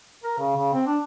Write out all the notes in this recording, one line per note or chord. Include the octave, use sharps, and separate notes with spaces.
A#4
C#3
C#3
C4
D4